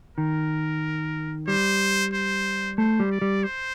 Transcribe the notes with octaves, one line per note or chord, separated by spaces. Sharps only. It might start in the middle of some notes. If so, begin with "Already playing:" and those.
D#3 A#4
G3 C5
C5
A3 C5
G3
D5
G3
C5